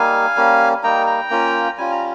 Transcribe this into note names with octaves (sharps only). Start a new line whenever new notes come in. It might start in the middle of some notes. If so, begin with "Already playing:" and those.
Already playing: G3 A#3 D#4 F5 G#5
G3 A#3 C#4
G3 A#3 D#4 G5 A#5
G5 A#5
A#3 C#4 F4
G3 C#4 F4 G#5
A#5